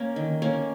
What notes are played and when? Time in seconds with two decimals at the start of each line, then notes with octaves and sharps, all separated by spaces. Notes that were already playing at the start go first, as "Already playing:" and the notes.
Already playing: A#3 C#4 A#4
0.16 D#3
0.42 A#3 C#4